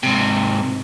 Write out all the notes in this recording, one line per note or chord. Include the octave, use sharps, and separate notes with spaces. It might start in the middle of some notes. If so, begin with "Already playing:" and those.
G#2 C3